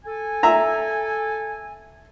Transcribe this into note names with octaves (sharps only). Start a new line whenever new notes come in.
A4 G#5
E5 A#5